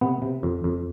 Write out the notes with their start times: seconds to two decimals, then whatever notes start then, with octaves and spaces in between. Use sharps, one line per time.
0.01 C3 B3
0.22 C3
0.43 F2
0.64 F2